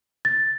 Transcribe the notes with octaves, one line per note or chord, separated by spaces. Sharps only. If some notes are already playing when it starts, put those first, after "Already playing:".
A6